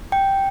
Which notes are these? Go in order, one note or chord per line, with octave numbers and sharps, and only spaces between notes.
G5